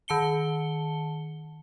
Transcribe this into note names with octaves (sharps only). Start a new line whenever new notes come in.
D#3 A5 C#7 G7